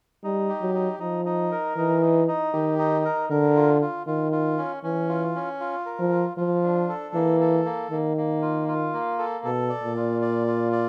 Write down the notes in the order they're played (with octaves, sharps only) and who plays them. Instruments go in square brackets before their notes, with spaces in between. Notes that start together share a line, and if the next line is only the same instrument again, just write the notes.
[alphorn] G3 [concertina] D#4
[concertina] G4
[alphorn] F#3
[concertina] D#4
[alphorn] F3 [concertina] D#4
[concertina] D#4
A#4
[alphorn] E3 [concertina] D#4
[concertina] D#4
D#4
[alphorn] D#3 [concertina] G4
[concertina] D#4
A#4
[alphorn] D3 [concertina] A#4
[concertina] F4
F4
[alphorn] D#3 [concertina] F4
[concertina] F4
C#4
[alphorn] E3 [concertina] C#4
[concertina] F4
C#4
F4
A#4
[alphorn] F3
[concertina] F4
[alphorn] F3 [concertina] F4
[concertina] D4
A4
[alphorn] E3 [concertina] A#3
[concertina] A4
A#3
[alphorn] D#3 [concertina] A#3
[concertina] A#3
F4
F4
A#3
A4
[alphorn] B2 [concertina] A4
[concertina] D5
[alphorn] A#2
[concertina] F4
D5
F4
D5